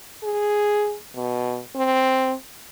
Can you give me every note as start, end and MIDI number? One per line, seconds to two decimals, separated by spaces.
0.23 0.96 68
1.15 1.60 47
1.76 2.34 60